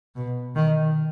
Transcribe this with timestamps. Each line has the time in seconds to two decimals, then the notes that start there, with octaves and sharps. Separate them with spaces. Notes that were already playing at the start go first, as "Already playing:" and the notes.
0.16 B2
0.56 D#3